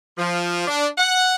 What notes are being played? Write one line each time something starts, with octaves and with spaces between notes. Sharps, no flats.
F3
D4
F#5